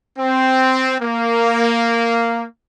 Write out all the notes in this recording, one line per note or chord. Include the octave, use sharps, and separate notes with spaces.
C4
A#3